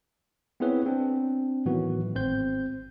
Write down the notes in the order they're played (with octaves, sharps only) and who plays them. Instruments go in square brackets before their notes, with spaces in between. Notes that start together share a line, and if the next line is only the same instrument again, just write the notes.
[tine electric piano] B3 C4 E4 G#4 B4 C#5
C4 D4
A2 D#3 E3 F#3 B3 F#4
G#1 C4 C5 G6